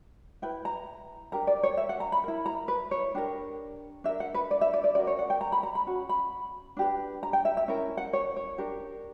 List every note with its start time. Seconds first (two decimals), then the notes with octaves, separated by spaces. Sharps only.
0.42 E4 B4 G5
0.65 A#5
1.32 D4 G4 A#4 A#5
1.47 D5
1.63 C#5
1.77 E5
1.89 F#5
2.00 A#5
2.12 B5
2.24 E4 A#4
2.46 A#5
2.68 B4
2.91 C#5
3.15 D4 G4 A#4
4.04 D4 E5
4.08 A#4
4.20 F#5
4.34 B4
4.51 D5
4.61 E5
4.73 D5
4.84 D5
4.95 C#4 F#4 A#4 D5
5.07 C#5
5.19 F#5
5.30 G5
5.41 A#5
5.52 B5
5.63 A#5
5.75 B5
5.86 C#4 F#4
6.09 B5
6.77 D4 G4 B4
7.23 A#5
7.33 G5
7.45 E5
7.57 E5
7.68 C#4 E4 A#4
7.97 F#5
8.13 C#5
8.36 C#5
8.58 D4 G4 A#4